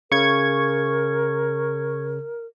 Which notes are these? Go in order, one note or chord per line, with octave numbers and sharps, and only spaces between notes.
C#3 A#4 C#6 G#6